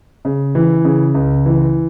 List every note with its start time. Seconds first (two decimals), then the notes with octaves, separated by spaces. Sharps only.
0.25 C#3
0.55 E3
0.85 C#3
1.14 C#2
1.46 E3